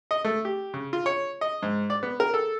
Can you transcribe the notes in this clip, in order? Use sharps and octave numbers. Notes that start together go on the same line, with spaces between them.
D#5
A3
G4
C#3
F4
C#5
D#5
G#2
D5
B3
A#4
A4